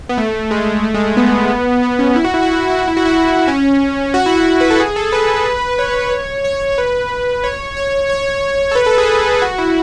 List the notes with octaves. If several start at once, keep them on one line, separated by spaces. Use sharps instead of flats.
B3
A3
G#3
A3
G#3
A3
G#3
B3
B3
C#4
E4
F#4
E4
F#4
E4
F#4
E4
F#4
E4
F#4
E4
C#4
F#4
E4
F#4
B4
A4
G#4
A4
B4
C#5
C#5
C#5
B4
C#5
C#5
C#5
A4
B4
A4
G#4
F#4
E4